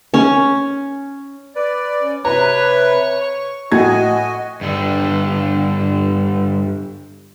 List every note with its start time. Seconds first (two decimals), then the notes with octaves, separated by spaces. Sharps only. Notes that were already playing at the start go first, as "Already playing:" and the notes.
0.14 C#4 C#5
1.56 B4 D5
2.02 C#4
2.25 C3 B4 C#5 A#5
3.21 C#6
3.72 A2 A3 F#4 D#5 G#5 G#6
4.61 G2 D3